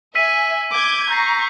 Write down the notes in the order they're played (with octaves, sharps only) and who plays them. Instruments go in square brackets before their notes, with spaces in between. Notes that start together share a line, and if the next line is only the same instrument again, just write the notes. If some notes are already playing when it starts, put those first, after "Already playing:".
[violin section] E5 G#5 [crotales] E6 B6 D#7
[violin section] D6 G6 G#6
[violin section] A#5 C#6 [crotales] G6 A#6 C7